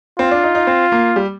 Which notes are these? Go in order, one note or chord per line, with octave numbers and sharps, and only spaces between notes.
C4 F4
D4
D#4
D#4
C4
A#3
G3